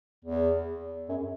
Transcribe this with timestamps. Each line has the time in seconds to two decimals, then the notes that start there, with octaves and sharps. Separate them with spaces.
0.25 E2
1.09 F#2